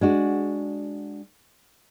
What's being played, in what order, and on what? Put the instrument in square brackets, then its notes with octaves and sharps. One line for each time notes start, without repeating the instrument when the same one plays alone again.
[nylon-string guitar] G#3 D4 F#4